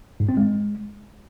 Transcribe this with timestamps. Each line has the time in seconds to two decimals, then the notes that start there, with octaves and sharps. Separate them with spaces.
0.20 G#2
0.29 C4
0.37 G#3